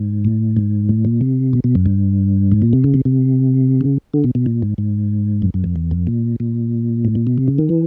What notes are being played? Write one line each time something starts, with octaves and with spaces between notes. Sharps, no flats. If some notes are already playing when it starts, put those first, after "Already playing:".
Already playing: G#2
A2
G#2
A2
A#2
C3
B2
B2
F#2
G2
G#2
A#2
C3
C#3
C3
C3
C#3
D3
B2
B2
A#2
G#2
G#2
F#2
F#2
F2
E2
F2
A#2
A#2
A2
A#2
B2
C3
C#3
D#3
E3